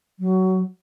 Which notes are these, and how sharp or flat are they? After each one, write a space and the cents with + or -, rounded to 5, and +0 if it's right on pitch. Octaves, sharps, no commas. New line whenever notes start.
F#3 +20